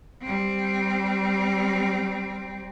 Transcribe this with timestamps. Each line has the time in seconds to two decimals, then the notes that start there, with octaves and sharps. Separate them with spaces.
0.22 G3 C4